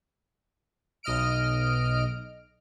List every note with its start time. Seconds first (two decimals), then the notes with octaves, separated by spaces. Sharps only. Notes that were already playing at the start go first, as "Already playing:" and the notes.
1.03 B1 D#5 F6 D7